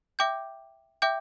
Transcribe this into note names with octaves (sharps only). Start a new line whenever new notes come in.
E5 G5 D6 G6
E5 G5 D6 G6